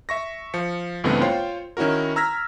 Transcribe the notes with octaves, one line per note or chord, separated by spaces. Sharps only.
E5 C#6 A#6
F3 C#7
C#2 G2 E3 A3 B3 C4
F4 C5 C#5 G5 C6
D#3 C#4 E4 F#4 A#4
A#5 E6 F6 G#6 A#6 B6